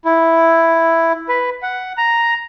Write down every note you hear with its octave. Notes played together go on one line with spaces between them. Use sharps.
E4
B4
F#5
A#5